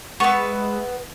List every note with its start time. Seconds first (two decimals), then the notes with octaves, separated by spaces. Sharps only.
0.20 G#3 B3 B4 E5 C#6